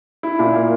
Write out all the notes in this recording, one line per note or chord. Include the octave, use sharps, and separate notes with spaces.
E4
A#2
A#3